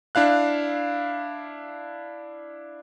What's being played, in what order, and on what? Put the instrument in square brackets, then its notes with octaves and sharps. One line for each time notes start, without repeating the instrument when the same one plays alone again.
[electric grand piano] D4 E4 F5 F#6